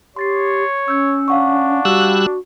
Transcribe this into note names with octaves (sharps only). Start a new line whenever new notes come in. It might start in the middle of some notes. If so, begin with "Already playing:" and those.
G4 C#5 C6 A6 C7
C#4 E6 G6 C#7
D4 F5 F#5 C#6
G3 F#4 E6 F#6